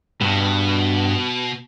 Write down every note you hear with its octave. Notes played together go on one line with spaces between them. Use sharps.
G2 B2